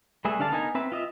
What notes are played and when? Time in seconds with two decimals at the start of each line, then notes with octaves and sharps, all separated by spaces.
0.25 G3 A3 G#4 B4 E5
0.39 D3 D4 F5 A5
0.52 B3 D#4 A#4 G#5
0.75 C4 B4 E5
0.92 F4 D#5 E5